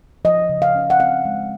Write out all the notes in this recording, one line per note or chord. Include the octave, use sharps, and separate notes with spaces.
F3 D#5
C#3
F5
C#4
F#5
C4 F5
G#3